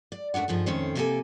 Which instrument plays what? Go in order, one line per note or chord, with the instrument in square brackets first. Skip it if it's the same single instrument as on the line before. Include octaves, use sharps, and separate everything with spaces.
[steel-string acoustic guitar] D5
F#2 A3 D4 F4 F#5
G2 F3 D#4 G#4
F2 A2 D#3 C#4 C5
C3 F3 A#3 G4 A4 G#5